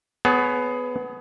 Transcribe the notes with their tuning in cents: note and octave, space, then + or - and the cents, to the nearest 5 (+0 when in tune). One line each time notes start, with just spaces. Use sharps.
B3 +15 G#4 +30 C#5 +0